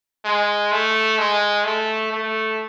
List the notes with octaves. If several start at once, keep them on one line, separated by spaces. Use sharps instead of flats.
G#3
A3
G#3
A3
A3